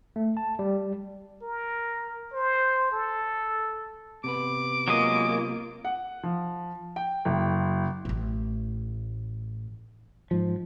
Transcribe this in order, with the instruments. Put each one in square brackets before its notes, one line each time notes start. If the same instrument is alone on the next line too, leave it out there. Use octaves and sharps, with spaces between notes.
[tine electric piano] A3
A5
G3
[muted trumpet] A#4
C5
A4
[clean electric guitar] C3 B3 B4 [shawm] D6
[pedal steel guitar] F#3 G#3 D#5 [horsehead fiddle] A#3 F4
[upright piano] F#5
F3
G5
F#1
[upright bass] A1 A2
[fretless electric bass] G#2 F3